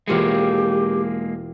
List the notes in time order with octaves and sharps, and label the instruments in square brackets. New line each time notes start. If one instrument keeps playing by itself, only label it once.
[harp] E1 F4 C#7 [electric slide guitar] G#3 A#3 [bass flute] G4